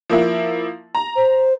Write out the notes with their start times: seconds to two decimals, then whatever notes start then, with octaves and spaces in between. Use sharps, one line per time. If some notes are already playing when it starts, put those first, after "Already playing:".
0.09 F3 A#3 E4
0.95 A#5
1.16 C5